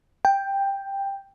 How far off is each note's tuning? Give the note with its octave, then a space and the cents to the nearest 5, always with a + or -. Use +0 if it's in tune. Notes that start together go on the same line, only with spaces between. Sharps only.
G5 +10